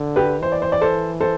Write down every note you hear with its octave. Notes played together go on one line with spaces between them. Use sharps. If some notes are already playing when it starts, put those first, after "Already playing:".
Already playing: D3
G4 B4
E3 C5
D5
C5
D5
A4 C5
A4 C5